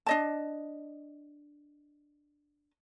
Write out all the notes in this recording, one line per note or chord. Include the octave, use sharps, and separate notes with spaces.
D4 D#5 A5